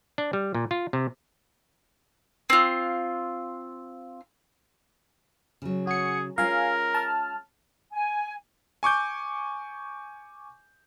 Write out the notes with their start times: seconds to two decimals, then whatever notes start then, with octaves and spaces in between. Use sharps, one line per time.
0.18 D4
0.33 G3
0.54 A#2
0.71 F4
0.93 C3
2.50 C4 F4
5.62 C#3 F#3
5.87 F#4 G#4 C#7
6.38 G#3 C#4 F4 A#4 F5 G#5
6.94 A5 F6
7.92 G#5
8.83 G#5 C#6 D6 G6